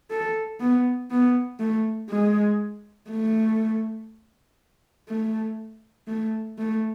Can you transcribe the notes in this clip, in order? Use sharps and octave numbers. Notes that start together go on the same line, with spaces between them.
A4
B3
B3
A3
G#3
A3
A3
A3
A3